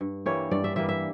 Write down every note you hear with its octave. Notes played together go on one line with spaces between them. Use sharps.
G2
E3 G3 A#3 C#5
G2 D5
E5
E3 G3 A#3 E5
E5